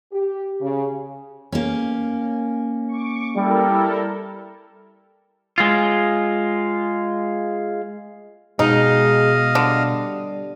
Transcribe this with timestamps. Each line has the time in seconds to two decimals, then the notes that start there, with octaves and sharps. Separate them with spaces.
0.13 G4
0.61 C#3
1.52 A#3 C#4
2.88 C#6 D6
3.36 G3 E4 A4 A#4
5.58 G#3 F4
8.59 B2 G#3 D#4 D#5 F5
9.55 D3 G3